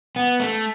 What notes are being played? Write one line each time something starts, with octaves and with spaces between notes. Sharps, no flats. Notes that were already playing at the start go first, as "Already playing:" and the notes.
B3
A3